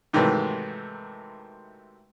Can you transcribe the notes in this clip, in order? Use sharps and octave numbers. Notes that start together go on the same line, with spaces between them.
G#2 C3 D#3 E3 F#3 A3